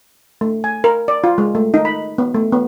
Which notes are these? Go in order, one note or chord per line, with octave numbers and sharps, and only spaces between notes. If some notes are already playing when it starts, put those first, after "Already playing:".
A3
G#5
A#4
D5
F4
G#3
A3
D#4
B5
B3
A3
B3